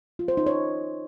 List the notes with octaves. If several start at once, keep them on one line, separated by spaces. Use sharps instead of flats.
F4
C5
D#4
C#5